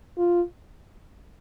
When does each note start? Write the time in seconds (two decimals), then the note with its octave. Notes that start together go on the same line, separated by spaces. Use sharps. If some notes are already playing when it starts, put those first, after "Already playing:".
0.18 F4